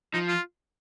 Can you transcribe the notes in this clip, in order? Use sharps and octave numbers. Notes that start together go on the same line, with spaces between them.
F3 D#4
F4